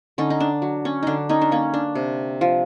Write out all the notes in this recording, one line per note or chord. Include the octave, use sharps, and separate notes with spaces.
D3 C#4 D#4
D#4
D4
F#3
C#4
D3 D4 D#4
C#4 D#4
D4
A#3 C#4
D4
C3
F3